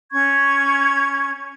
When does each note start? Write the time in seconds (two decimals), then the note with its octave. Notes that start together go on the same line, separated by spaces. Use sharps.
0.11 C#4 C#6 G#6